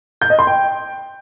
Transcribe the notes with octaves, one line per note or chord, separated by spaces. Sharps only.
G6
D#5
C6
G5